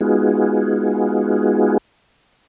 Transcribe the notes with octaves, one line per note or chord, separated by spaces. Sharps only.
G#3 B3 D#4 F4 F#4 G#4